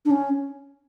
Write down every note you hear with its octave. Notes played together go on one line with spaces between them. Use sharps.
D4
C#4